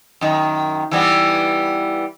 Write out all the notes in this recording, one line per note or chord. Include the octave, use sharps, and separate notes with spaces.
F#2 D#3
E3 G3 B3